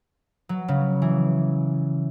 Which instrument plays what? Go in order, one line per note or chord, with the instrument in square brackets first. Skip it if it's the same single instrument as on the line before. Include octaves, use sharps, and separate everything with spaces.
[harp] F#3
C#3
E3